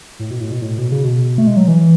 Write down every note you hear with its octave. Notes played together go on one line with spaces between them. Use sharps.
A2
B2
A2
B2
A2
B2
C#3
B2
A3
G#3
F#3
E3